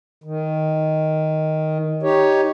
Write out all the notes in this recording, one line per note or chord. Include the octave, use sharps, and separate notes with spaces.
D#3
D#4 G4 C#5